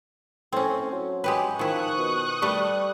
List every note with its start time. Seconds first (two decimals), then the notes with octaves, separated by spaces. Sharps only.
0.53 A2 C4 C#4
0.92 F#3
1.24 G#3 G4 B4
1.59 D#3 F3 E4 C#6 D#6 F#6
1.98 B2
2.42 G3 A3 B4